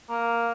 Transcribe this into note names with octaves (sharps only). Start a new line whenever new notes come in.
A#3